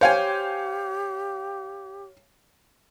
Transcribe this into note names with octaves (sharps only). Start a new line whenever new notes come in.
G4 C5 C#5 F5 G5 G#5